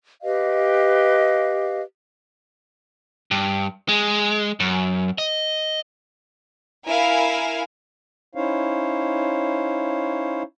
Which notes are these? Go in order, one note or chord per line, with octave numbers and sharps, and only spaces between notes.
G4 B4 D#5 F5
G2
G#3
F#2
D#5
E4 A#4 F5 G#5
C#4 D#4 E4 C5 C#5 F5